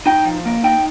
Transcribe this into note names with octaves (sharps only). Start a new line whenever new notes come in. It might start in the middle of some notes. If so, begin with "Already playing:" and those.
D#4 G5
F3
A#3
D#4 G5